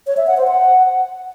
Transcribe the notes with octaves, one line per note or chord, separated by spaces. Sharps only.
C#5
E5
F#5
C5
F#5